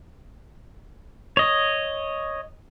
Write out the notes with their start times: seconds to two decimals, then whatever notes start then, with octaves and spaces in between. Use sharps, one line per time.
1.37 C#5 D#5